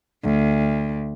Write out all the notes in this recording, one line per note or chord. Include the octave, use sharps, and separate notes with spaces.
D2